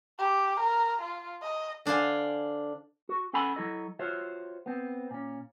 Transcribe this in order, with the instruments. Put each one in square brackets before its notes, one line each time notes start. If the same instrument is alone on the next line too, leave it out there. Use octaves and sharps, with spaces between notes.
[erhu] G4
A#4
F4
D#5
[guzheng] D3 D4 C5 F5 G#5
[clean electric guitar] F#4
C#4 A4 F#5 G#5 B5
F#3 E4 A4 D#5
F4 F#4 C5 C#5 E5
B3 C4
A#2 C#4